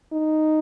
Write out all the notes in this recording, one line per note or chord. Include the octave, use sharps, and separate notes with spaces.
D#4